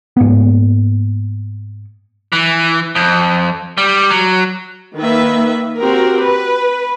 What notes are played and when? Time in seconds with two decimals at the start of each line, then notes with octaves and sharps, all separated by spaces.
0.17 G#2 A#3 B3
2.32 E3
2.95 F2
3.78 G3
4.11 F#3
4.95 D#3 A#3 B4 E5
5.79 C4 F#4 G4 A#4
6.24 B4